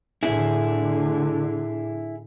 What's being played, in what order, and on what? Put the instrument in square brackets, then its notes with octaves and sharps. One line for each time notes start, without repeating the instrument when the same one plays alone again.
[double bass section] A2 D3 [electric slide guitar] E4 G#4